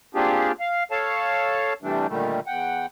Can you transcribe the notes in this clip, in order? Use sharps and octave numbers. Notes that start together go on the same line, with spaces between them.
A#3 C4 D4 F4 G4 G#4
F5
A4 C#5 F5 A5
C3 E3 G3 A3 D4
A#2 D3 D#3 G3 A3
E2 F#5 G5